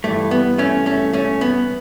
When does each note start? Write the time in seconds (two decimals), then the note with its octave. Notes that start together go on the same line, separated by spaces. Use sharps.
0.04 G2 E3 A3
0.31 B3
0.58 A3 C#4
0.86 A3 C#4
1.13 A3 C#4
1.41 B3